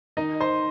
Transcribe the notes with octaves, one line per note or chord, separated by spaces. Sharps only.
D#3 D#4 D#5
C5 C6